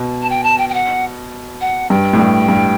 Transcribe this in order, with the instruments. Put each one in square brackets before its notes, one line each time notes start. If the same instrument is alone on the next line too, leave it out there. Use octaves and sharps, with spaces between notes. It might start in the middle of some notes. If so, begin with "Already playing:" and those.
Already playing: [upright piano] B2
[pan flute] A5
G5
A5
G5
G5
F#5
F#5
[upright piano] G2 [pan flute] G5
[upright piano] A2
G2
G2